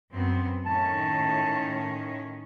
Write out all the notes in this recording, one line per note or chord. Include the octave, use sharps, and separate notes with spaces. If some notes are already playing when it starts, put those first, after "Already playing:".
F#2 B3 C4
A2 D#3 C#4 A5